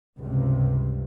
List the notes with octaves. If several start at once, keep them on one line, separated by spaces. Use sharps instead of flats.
C#2 G2 C3